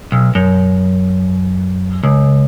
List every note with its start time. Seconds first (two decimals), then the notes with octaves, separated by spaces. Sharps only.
0.12 B1
0.35 F#2
2.03 C#2